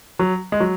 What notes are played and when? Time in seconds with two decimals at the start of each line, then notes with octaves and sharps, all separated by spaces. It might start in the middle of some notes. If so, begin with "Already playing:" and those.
0.19 F#3
0.52 G#3
0.60 F#3